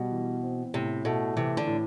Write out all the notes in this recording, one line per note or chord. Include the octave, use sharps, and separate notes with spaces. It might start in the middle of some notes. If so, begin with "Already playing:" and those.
Already playing: B2 G3
E3
C4
A2 C3
B2 A3
C3 E3
D3
A2